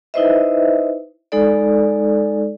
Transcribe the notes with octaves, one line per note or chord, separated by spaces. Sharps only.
D#4 E4 B4 C5 D#5 E5
G#3 D#4 A4 D5